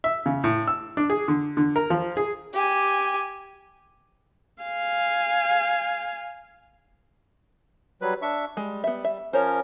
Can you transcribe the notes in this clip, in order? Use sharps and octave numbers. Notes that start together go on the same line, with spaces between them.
E5
C#3
A2
E6
D4
G#4
D3
D3
A#4
F3
G#4
G4 G#5
F5 G#5
F#3 G3 B4
D4 E5 C#6
G3 G#3
B3 E5
E5
F3 C#4 A#4 C5 C#5